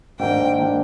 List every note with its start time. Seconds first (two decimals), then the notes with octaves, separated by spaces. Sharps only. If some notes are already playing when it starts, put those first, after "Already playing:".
0.19 G#2 D#3 A#3 D4 G5
0.59 D#3 A#3 D4